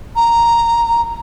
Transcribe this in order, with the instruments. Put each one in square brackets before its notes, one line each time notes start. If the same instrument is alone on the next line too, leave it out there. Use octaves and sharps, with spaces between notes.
[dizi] A#5